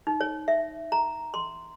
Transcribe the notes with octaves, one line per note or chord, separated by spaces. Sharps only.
D#4
C#5
E5
A#5
C6